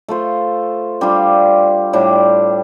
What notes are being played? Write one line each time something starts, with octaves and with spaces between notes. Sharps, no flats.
A3 F4 A4 C5
G3 D4 F4
A2 G3 D4